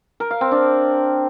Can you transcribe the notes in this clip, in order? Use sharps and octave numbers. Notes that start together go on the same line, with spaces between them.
A#4
F5
C4
D4